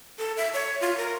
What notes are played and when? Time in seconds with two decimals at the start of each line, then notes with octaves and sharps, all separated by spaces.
0.18 A4
0.37 E5
0.54 C#5
0.81 F4
0.97 A#4